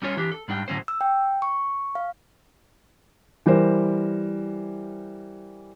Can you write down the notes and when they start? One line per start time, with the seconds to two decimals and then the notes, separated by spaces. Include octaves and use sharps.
0.02 G3 C#4 F4 C#5
0.17 E3 D4 G4
0.32 A4
0.48 G#2 G3 D4 G5
0.68 A2 D3 F#3 C#4 C5
0.88 E6
1.01 G5
1.42 C#6
1.95 F5
3.46 E3 G3 A#4 C5